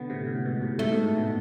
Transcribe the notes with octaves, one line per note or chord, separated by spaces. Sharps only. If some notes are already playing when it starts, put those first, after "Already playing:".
Already playing: B2 D3 B3
A2 C3
A2
G#2 B2
A2 C3
G#2 B2 A3
G#2 B2
A2
B2